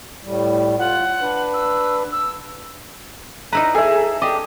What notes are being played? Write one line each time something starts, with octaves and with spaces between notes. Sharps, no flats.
A2 G3
F4 F#5
D4 B4
E6
E6
D#4 E4 B4 D5 A#5
G#4 A4 E5
D4 G4 D#5 D#6